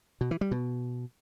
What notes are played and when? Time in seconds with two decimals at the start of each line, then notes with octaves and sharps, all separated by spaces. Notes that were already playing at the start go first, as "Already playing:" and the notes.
0.21 B2
0.31 E3
0.41 G3
0.51 B2